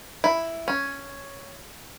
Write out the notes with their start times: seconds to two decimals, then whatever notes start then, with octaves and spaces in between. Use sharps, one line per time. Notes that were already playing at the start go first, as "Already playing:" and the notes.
0.24 E4
0.68 C#4